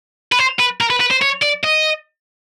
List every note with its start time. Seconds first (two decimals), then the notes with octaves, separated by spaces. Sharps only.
0.32 B4
0.39 C5
0.59 B4
0.81 A#4
0.90 B4
1.01 B4
1.11 C5
1.22 C#5
1.43 D5
1.64 D#5